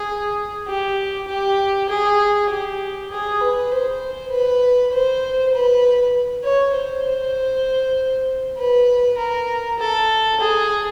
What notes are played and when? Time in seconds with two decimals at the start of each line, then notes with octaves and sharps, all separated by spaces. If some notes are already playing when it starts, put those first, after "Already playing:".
Already playing: G#4
0.68 G4
1.28 G4
1.89 G#4
2.49 G4
3.11 G#4
3.41 B4
3.71 C5
4.31 B4
4.93 C5
5.54 B4
6.44 C#5
6.75 C5
8.58 B4
9.18 A#4
9.79 A4
10.40 G#4